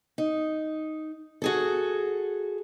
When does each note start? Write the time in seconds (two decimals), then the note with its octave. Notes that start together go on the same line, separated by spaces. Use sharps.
0.18 D#4
1.42 F#4 G#4 A4